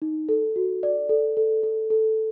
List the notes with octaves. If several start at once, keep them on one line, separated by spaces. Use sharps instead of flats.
D#4
A4
F#4
D5
A4
A4
A4
A4